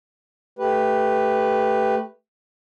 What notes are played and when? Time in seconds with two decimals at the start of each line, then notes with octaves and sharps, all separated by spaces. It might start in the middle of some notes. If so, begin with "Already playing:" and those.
0.59 A3 G4 B4